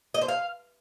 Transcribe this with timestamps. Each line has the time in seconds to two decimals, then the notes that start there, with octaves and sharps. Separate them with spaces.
0.14 D#5
0.21 C5
0.28 F5